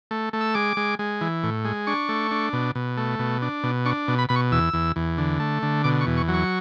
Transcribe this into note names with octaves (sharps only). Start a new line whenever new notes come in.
A3
A3
E6
G#3 D6
G#3
G#3
E3
A2
G#3
D4 C#6
A3
D4
B2
B2
A3
B2
D4
B2
D4 C#6
B2
B5
B2 B5
C#6
E2 E6
E2
E2
D3
A3
D3
B2 D6
C#6
E2
C#6
F#3
C#6